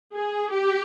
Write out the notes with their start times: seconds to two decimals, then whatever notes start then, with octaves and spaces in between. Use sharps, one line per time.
0.15 G#4
0.52 G4